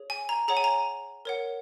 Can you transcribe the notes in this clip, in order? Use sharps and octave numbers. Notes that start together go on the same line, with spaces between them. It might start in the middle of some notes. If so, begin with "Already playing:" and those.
Already playing: G#4 C#5
G#5
A#5
G#4 C#5 F#5 A#5
G#5
A#5
A#4 C#5 F#5